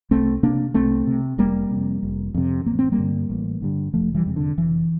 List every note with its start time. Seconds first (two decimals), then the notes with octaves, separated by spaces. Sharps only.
0.11 C2 A3 C4
0.43 C3 A#3 D4
0.74 C2 A3 C4
1.07 C3
1.38 F1 G3 A#3
1.71 C3
1.76 F2
2.03 F1
2.34 F2 C3
2.66 A1 A#3
2.79 C4
2.92 G3 A#3
2.98 G2 D3
3.30 A1
3.62 G2 D3
3.94 F1 F3 A3
4.15 E3 G3
4.26 E2 C3
4.36 D3
4.57 F1 E3